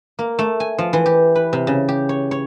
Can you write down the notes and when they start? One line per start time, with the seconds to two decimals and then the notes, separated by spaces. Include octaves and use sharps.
0.19 A#3
0.39 A3
0.60 G#5
0.78 F3
0.93 E3
1.06 G4
1.35 B4
1.53 C3
1.67 C#3
1.88 G4
2.09 C#5
2.31 C#5